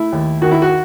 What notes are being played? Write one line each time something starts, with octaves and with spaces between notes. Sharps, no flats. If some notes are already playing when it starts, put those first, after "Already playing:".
Already playing: A3 E4
D#2
D#3 F#4
E4
F#4